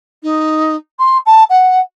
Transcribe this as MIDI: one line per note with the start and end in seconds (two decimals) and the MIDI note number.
0.23 0.76 63
0.99 1.18 84
1.26 1.44 81
1.50 1.80 78